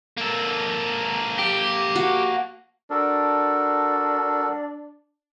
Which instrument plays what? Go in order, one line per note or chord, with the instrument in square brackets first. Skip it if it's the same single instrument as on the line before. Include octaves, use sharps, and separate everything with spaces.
[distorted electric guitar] A#3 A4
[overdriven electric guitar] G4
[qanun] F#4
[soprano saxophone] D4 [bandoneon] F#4 A4 A#4